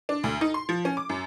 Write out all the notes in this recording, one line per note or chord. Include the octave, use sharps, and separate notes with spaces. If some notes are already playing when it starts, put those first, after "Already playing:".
D4
D2
D#4
C6
F3
C#4
D6
F#2